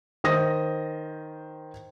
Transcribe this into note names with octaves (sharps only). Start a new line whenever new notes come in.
D#3 C5 D#6 A#6